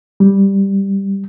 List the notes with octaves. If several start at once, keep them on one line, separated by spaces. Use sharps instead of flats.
G3